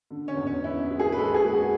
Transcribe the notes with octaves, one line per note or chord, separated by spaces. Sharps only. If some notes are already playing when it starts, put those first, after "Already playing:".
D3
C#4
E2
C#4
B3 E4
G#3
G#4
B4
G#3 A4
G#4
G#3
F#4